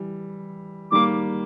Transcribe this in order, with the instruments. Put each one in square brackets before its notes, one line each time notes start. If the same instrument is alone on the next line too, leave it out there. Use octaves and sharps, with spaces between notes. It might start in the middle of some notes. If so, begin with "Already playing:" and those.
Already playing: [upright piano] E3 G3
[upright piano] D#3 G3 A#3 [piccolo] D6